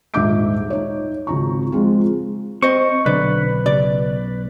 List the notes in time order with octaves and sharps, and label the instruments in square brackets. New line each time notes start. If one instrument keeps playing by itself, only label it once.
[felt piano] D#1 G#2 E5 D6 G6 D7
D#4 C#5
G#1 C#2 A#5 C#6
F3 G#3 C4 F4
[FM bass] C4 [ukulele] C5 D#5 [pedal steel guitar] C#6
[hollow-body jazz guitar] B1 [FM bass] D3 [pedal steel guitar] B4 [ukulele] D5
[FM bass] C#3 [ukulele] D5